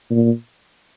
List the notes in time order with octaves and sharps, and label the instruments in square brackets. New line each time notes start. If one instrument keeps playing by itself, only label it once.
[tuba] A#2